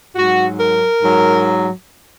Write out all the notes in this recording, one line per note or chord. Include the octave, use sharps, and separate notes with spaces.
G#2 F#3 F#4
A#4
G#2 F#3